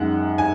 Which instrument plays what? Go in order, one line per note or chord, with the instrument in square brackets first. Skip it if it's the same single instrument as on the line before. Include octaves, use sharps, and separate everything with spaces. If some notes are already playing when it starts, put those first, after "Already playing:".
Already playing: [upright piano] F#2 D#3 G#3 F#5
G#5